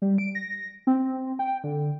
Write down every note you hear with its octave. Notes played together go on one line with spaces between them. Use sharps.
G3
D7
A#6
C4
G5
D3